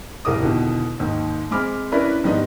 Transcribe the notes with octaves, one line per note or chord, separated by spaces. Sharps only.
D#1 C2 A#4 D6 D#6
E2 B2 D3 D#3
D#2 G#2 D#3
G#3 C4 B5 D6 F6
C#4 D4 E4 A#4 B4 D5
G#2 D#3 G3 B3 D4 D#4